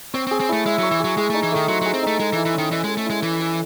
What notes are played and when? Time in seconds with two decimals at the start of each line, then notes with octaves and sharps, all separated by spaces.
0.14 C4 C#5
0.27 C4
0.31 G#4
0.40 C4
0.49 A3 E4
0.66 G#3 E5
0.79 F#3
0.83 C#5
0.91 E3
1.00 F#3 G#4
1.17 G#3 G#4
1.30 A3
1.34 D#4
1.43 E3
1.52 D#3 A3
1.68 F#3 C5
1.81 F#3
1.86 G#4
1.94 C4
2.03 A3 D#4
2.20 G#3 A4
2.33 E3
2.37 E4
2.45 E3
2.54 D#3 C#4
2.72 E3 D#5
2.84 G#3
2.88 A4
2.97 A3
3.06 G#3 E4
3.23 E3 C#5
3.40 A4